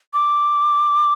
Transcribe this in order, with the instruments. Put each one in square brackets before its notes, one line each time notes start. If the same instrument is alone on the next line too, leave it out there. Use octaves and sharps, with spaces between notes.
[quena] D6